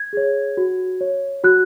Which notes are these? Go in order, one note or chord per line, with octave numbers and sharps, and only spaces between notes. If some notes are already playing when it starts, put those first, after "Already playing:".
Already playing: G#6
G#4 C#5
F#4
C#5
F#4 F#6